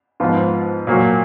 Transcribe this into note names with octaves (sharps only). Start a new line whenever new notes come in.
G#2 F3 B3 F4
A#2 F#3 A#3